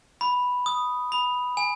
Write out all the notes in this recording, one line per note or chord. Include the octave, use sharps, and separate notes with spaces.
B5
D#6
B5
G#5